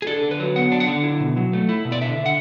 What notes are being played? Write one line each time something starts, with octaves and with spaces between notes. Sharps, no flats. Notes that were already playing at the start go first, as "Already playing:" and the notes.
G#4
D4 A4
D3
B4
F#3
B3 F#5
D4
F#5
D3
E4
B2
F#3
A3
E4
B2
D5
D3 E5
D3
F#5